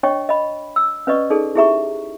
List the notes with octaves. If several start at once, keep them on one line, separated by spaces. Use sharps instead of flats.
D4 C#5 D#5 G5 C#6
D#5 B5
E6
C#4 B4 D5 D#5 C#6
D#4 G#4 A4 D5
E4 G4 G#4 E5 A#5 C#6